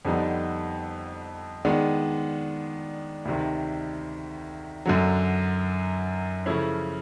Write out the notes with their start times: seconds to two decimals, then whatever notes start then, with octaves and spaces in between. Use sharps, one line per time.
0.05 F2 D3 G3 B3 D#4
1.65 D#3 G#3 B3 D4
3.25 D2 C3 D#3
4.86 F#2 D3 F#3
6.46 C#3 F3 A3 C#4 E4